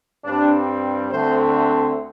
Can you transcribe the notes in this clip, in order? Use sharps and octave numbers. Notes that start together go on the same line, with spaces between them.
G2 G3 C4 D4
D2 D3 A3 C4 C5